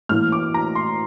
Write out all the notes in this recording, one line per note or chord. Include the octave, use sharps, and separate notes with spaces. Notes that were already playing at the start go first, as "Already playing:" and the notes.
A2 E3 A#3 F6
D6
A#5
C6